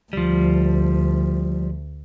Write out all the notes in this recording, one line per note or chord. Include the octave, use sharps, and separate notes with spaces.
D2 F3 G3